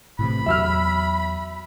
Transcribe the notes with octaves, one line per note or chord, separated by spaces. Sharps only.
A2 C3 E3 B5
E2 F#3 E5 E6 F6